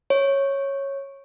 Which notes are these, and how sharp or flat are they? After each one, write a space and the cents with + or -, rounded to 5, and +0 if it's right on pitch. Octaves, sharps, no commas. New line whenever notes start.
C#5 -10